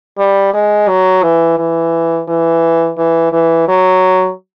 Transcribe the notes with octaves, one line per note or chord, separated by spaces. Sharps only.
G3
G#3
F#3
E3
E3
E3
E3
E3
F#3